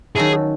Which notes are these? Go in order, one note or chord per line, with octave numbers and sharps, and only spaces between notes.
D#3 F#3 C#4 E4 G#4 A4